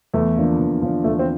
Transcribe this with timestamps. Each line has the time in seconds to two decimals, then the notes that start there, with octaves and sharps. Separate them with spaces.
0.14 E2 A3
0.37 D3 F3 A#3 D4
0.59 E2
0.82 D3 F3 A#3 D4
1.04 E2 A3
1.19 C4